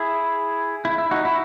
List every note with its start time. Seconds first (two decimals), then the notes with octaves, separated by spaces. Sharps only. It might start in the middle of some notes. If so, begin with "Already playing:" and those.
Already playing: E4 G#4
0.85 E4
0.98 E4
1.11 D#4 F#4
1.25 E4